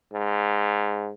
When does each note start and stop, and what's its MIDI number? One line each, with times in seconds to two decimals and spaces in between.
0.13 1.12 44